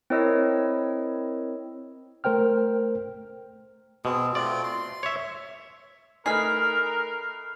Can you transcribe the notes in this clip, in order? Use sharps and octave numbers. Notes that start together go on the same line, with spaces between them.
C4 E4 A#4 C#5 D#5 E6
A3 A#4 C5 G5 F6
B2 C4 G#4
A3 C4 F4 D5
C6
C#5 E5
A3 D#4 G#4 A#4 B4 B5 F6 C7